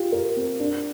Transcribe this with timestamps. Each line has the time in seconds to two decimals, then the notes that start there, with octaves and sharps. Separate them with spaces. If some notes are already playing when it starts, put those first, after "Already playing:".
Already playing: F4 G4
0.12 A#4
0.36 C4
0.60 D4